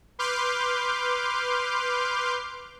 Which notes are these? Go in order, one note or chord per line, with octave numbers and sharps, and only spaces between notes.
B4 C6 D6 F6 G6